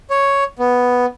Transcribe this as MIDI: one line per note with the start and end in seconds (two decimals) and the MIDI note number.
0.10 0.44 73
0.59 1.06 59